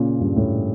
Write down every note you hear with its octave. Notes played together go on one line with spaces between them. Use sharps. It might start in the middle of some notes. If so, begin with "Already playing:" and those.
Already playing: A#2 C#3
G2
A2